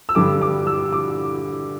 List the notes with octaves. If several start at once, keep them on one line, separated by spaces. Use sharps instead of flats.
E6
G2 D3 G3 D6
D6
E6
D6